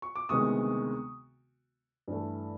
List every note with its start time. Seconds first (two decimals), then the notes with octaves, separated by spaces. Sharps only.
0.02 C#6
0.15 D6
0.29 D2 C3 D#3 G#3 B3 C#6 D#6
2.08 G2 E3 A3